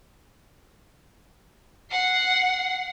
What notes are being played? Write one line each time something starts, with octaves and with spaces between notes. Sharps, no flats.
F#5 C7